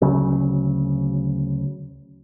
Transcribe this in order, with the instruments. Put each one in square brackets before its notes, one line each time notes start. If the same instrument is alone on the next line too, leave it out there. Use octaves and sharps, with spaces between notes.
[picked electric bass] D2 C#3 F#3